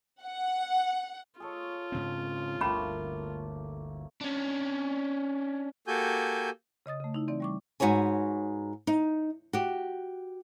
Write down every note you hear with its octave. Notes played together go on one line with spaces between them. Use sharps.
F#5
F4 G#4 A4 C#5
G#2 C#3 C4
G1 D2 A3 A#3 C#4 B5
C#4 D4
A#3 F#4 G4 A4 G#5 G6
C#3 D#5 D#6 A6
C#3 A3
D#4 E4
E3 C4 D5
G3 C#6 D6
G#2 F#4 B4 C#5 G#5
D#4
F#4 G4